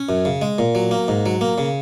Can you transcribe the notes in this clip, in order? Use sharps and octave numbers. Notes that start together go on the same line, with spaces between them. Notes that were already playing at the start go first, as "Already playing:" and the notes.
Already playing: C#4
F#2
C#3
G#3
A#2
F#3
A#3
G#2
F#3
A#3
C#3